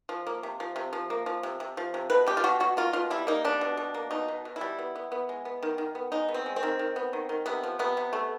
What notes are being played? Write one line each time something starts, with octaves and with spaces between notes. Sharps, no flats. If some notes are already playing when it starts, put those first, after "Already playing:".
F3
A#3
C3
F3
C3
F3
A#3
F3
C3
C3
F3
C3
B2 B4
B2 G4
F4
B2 F#4
B2 F#4
A#3 F4
B2 F4
G3 E4
A#3 D#4
G3 D4
B2
B2
A#3
B2 D#4
B2
B2
E4
G3
B3
B3
B3
G#3
B3
D#3
D#3
B3
G#3 D#4
B3
C4
G#3
C4
D#3
D#3
B3
D#3
D#3
C3 B3
F3
C3 B3
C3
A3